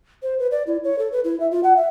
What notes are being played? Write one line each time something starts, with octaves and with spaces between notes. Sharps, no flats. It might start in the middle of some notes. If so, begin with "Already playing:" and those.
C5
B4
D5
E4
C#5
A4
B4
E4
E5
F4
F#5
E5